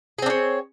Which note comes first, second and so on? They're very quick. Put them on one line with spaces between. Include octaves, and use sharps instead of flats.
G#4 C4 D4 C#5